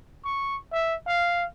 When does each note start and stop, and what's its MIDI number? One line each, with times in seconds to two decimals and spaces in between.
0.24 0.57 85
0.72 0.96 76
1.07 1.45 77